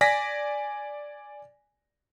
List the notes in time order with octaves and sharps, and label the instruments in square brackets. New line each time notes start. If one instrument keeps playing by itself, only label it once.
[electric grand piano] D5 G#5 A#6 B6